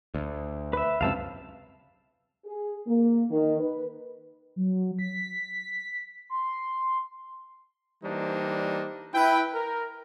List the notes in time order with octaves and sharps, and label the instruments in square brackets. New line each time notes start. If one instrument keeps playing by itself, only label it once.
[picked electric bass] D2
[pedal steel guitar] B4 E5
[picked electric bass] C#2 F#2 C3 [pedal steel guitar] F5 A5 E6
[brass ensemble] G#4
A#3
D#3
B4
[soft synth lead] F#3
B6
C6
[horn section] E3 G3 A#3 D4 D#4 C5
E4 B4 G5
A#4